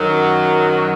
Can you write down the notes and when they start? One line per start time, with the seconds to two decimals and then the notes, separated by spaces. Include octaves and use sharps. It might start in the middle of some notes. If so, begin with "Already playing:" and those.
Already playing: F#2 D#3 F#3